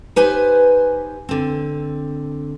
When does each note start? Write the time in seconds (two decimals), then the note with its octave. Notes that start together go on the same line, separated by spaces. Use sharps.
0.16 D#4 G4 B4 C5 G#5
1.29 D3 C4